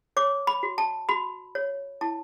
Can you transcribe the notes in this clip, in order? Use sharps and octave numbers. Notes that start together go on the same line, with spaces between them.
C#5 D6
B5
F#4
A5
F#4 B5
C#5
E4 A5